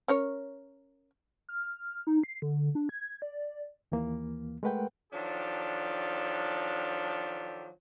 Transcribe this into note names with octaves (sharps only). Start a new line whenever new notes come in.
C#4 A#4 C#5
F6
D#4
C7
D3
D4
G#6
D5
D#2 E3 A#3
G#3 A3 A#4 B4 F#5 G5
D#3 F3 F#3 D4 G4 A4